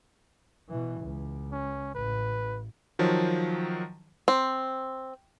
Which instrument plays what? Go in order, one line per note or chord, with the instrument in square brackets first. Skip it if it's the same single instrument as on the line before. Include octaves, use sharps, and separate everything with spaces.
[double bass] B2 E3
C#2
[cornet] C#4
[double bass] A1 [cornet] B4
[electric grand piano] D#3 F3 F#3
[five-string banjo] C4